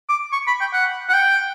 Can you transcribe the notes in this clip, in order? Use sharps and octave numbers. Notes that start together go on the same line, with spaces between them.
D6
C#6
B5
G5
F#5
F#5
G5